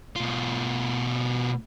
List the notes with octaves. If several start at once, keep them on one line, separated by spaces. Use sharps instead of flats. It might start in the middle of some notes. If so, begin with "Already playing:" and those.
B2 F4